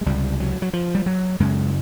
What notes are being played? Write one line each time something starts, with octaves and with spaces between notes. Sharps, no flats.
G#3
C#2 C3 G3
F#3
F#3
F3
G3
F#3
F#2 C#3 G#3